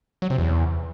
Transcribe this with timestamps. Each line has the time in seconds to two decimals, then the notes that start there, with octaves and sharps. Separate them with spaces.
0.22 F#3
0.30 C3
0.38 E2